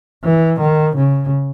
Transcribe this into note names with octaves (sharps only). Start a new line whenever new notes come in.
E3
D#3
C#3